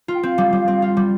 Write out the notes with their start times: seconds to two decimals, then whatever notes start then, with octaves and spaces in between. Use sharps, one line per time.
0.08 F4
0.15 G5
0.23 C4 F5
0.38 G3
0.53 G3
0.68 C4
0.82 F4
0.97 G3